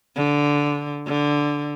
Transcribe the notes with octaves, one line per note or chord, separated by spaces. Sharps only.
D3
D3